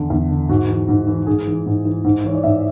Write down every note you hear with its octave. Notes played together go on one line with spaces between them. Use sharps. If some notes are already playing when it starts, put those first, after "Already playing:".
Already playing: E2 D3
E2
D3
G#2 F#4
E3
G#2
E3
G#2 G#4
E3
G#2
E3
G#2
E3 C#5
D5
G#2 E5